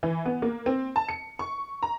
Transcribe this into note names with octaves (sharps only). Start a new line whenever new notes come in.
E3
B3
A#3
C4
A5
C#7
C#6
A#5